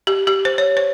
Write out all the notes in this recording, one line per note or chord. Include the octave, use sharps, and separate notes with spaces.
G4
G4
C5
C#5
C5